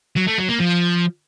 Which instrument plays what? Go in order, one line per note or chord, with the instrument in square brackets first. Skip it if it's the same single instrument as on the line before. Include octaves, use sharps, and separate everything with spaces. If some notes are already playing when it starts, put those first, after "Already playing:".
[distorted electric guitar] F#3
A3
F#3
A#3
F3